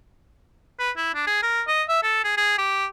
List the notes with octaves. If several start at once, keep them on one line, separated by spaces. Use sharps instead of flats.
B4
E4
D4
G#4
A#4
D#5
E5
A4
G#4
G#4
G4